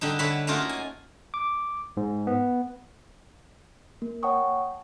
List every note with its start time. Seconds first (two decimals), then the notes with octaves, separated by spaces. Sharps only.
0.01 D3 G3 D4 D#4
0.19 D3 B4 C#5 E5 A5 B5
0.47 A3 A#3 C#4 D#4 F4 F#4
0.69 G#5
1.34 D6
1.97 G#2
2.27 B3
4.02 A#3
4.23 C#5 F#5 G5 A5 C#6 D#6